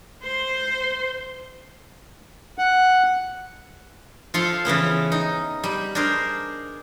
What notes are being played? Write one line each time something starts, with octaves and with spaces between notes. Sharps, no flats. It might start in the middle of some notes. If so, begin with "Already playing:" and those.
C5 C6
F#5
F3 F4 A4 F5 C6
C#3 E3 B3 C#4
D#4
G3
D4 G#4 A#4 C5